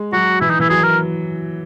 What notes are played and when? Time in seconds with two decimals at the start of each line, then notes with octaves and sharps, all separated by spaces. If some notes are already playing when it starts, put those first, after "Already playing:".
Already playing: G#3
0.13 F#3 F#4
0.41 E3 E4
0.50 D#4
0.60 E3 E4
0.69 F#3 G#4
0.83 A#4